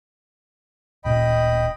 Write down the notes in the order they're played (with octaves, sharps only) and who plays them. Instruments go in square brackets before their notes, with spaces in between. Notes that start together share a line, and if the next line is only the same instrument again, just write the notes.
[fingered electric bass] D1 A#2 C#4 [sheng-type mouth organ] D#5 G5 B5